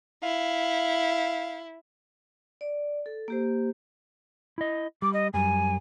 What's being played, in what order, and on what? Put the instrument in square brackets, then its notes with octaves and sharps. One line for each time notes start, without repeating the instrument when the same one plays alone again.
[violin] E4 [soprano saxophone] F5
[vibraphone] D5
A4
A#3 G4 C5
[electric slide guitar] E4 D#5
[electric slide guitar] G3 [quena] D6
[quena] D#5
[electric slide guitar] F#2 G3 [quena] G#5